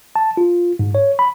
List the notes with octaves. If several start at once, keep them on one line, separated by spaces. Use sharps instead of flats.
A5
F4
G#2
C#5
B5